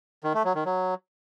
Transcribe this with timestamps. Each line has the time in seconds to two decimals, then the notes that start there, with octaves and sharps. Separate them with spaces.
0.24 D#3
0.34 A3
0.45 F#3
0.55 D#3
0.66 F#3